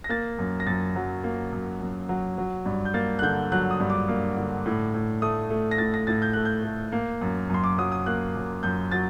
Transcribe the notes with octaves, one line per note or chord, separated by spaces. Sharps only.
A#6
A#3 A6
F#2
A#6
F#2 A6
F#3
A#3
F#2
F#2
F#3
F#3
G2
G6
A#3 A6
F#6
D3 G6
F#3 F#6
D#6
G2
D6
A#3
D3
A2
A2
A3 D#6
A3
A#6
A2 A6
A#6
A2 A6
G6
A3 F#6
G6
A3
A#3
F#2
F#2 C6
D6
F#3 D#6
D#6
A#3 F#6
F#2
F#2 G6
F#3 A6